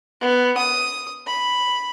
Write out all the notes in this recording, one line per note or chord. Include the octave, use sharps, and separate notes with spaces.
B3
D#6
B5